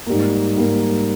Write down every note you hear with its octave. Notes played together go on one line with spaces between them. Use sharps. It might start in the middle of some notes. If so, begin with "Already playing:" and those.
G#2 G3 A#3
G#2 G3 A#3